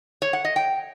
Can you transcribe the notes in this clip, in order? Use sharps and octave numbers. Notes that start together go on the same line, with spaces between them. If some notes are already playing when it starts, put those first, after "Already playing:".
C#5
F#5
D#5
G5